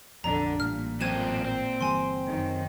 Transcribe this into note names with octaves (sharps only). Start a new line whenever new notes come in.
A#1 F2 D3 D4 A#5
A1 A#2 G3 F6
F#2 C4 G#6 D#7 E7
C4
G1 E3 G3 G#5 C6
F#2 D#3